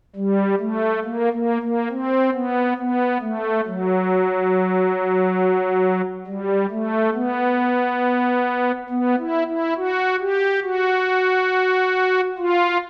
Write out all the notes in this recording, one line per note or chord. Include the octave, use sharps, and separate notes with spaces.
G3
A3
A#3
A#3
A#3
C4
B3
B3
A3
F#3
G3
A3
B3
B3
E4
E4
F#4
G4
F#4
F4